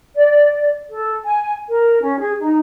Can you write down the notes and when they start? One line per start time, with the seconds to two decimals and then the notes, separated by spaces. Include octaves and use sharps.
0.16 D5
0.91 A4
1.24 G#5
1.69 A#4
2.01 C#4
2.19 G#4
2.39 D#4